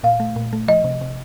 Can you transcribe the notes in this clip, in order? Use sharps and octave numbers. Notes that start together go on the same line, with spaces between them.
A#2 F5
A3
A#2
A3
F3 D#5
C3
C3